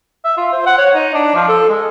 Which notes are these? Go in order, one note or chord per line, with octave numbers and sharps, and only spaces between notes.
E5
F4
C5
F#5
C#5
D#4
D4
F3
A4
G#3